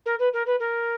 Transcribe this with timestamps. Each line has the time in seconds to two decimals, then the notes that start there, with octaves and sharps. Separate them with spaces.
0.06 A#4
0.19 B4
0.33 A#4
0.46 B4
0.60 A#4